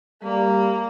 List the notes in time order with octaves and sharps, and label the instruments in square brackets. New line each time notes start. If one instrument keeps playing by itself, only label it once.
[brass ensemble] G3 [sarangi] A#3